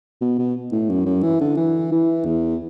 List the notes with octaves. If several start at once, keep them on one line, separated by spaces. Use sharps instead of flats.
B2
B2
A2
F#2
F#2
E3
D3
E3
E3
E2